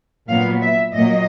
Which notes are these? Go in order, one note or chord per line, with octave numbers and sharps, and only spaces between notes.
A#2 F#3 B3 F5
E5
A#2 F#3 A#3 D#5